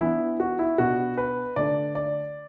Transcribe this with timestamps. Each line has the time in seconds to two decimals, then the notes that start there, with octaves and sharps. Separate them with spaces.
0.01 E3 B3 D4 E4
0.40 F#4
0.59 E4
0.78 B2 B3 D4 F#4
1.17 B4
1.56 D3 A3 D4 D5
1.95 D5